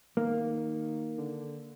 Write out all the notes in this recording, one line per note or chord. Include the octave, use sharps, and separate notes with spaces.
D#3 A#3
D3